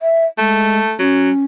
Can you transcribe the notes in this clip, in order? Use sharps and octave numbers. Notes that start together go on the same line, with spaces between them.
E5
G#3 A3
F#3 C#4